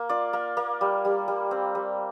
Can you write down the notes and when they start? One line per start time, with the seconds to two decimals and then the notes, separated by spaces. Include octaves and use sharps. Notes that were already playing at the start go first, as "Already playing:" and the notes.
Already playing: A#3
0.09 F4 D5
0.33 A#3
0.57 A#3
0.81 G3
1.05 G3
1.28 G3
1.51 C4
1.75 G3